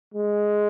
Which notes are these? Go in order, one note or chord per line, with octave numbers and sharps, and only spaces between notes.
G#3